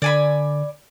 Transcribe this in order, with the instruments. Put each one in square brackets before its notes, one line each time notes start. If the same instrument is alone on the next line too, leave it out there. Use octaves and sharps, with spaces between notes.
[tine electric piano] D3 [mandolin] D5 G#5 B5